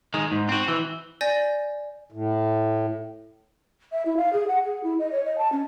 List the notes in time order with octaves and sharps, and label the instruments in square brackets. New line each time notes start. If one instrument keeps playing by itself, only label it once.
[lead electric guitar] D#3 G#3
G#2
C4 F#4
E3
[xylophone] D5 G#5 G6 A6 A#6
[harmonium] A2
[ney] E5
E4
F5
G#4
F#5
G#4
E4
D#5
C#5
D#5
A5
C#4